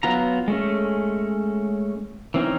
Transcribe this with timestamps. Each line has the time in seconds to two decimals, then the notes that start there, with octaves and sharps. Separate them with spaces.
0.03 F#3 B3 F4 A#5
0.48 G#3 A3 C#4
2.34 E3 C4 C#4 D#4